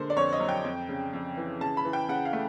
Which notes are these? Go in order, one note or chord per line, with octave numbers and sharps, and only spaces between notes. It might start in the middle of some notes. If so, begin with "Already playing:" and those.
Already playing: D3 G#3 A#3 C5
D5
F2 C#5
D#5
F#3
G5
F2
C#3
F2
E3
C#3 A5
B5
E3
G5
C#3 F#5
F5
A3